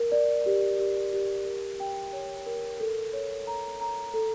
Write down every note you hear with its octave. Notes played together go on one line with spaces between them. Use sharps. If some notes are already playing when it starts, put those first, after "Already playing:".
Already playing: A#4
D5
G4
G4
G4
A#4
G5
C#5
A#4
A4
C#5
A#5
A#5
A4